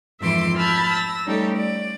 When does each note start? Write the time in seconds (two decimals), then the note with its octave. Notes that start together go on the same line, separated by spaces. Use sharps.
0.20 F2 G#2 E3 E5 C6 D6
0.56 A5 B5 E6 F6 G6 G#6
0.91 E6 A#6
1.25 G3 A3 C#4 D#4 G4 A4
1.56 D5